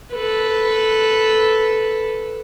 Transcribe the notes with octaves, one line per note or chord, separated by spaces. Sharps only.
A4 B4